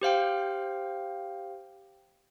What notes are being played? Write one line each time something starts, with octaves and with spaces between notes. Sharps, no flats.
G4 C5 F5 G5